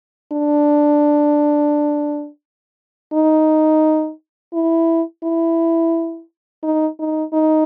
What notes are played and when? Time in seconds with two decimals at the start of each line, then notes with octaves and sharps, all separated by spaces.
0.32 D4
3.13 D#4
4.53 E4
5.24 E4
6.63 D#4
6.99 D#4
7.33 D#4